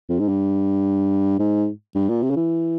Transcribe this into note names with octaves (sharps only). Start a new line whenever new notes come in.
F2
G#2
G2
G#2
G2
A#2
C3
C#3
E3